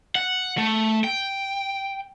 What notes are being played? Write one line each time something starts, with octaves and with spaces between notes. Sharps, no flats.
F#5
A3
G5